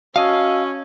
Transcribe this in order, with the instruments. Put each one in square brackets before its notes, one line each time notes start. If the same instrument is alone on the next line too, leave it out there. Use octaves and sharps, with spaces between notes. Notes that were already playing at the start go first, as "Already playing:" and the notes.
[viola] C#4 [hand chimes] F#4 A5 E6 [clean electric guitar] D#5 F5